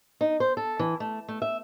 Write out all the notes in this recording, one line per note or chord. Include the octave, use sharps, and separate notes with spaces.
D#4
C5
A4
E3
A3
A3
E5